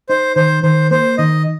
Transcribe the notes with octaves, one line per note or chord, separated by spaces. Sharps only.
D#4 C5
D#3 C5
D#3 C5
A#3 C5
D#3 D#5